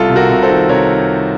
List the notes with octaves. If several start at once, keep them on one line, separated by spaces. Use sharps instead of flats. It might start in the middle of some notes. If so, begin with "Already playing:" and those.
Already playing: C2 F4 A4
C3
F#4 A#4
C3
A4 C5
D#3
C3 A#4 C#5